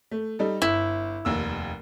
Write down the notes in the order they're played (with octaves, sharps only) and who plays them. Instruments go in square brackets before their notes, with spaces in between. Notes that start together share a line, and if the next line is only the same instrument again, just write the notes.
[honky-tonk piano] A3
G3 D#4 A4
[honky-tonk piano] G1 [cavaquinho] E4
[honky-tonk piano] F1 D#2 E6